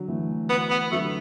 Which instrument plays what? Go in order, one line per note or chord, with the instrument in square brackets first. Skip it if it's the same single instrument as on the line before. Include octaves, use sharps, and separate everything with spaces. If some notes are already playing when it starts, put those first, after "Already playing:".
Already playing: [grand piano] D3 F#3
E3 A3
[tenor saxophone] B3
B3
[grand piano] D3 F#3 [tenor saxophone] A3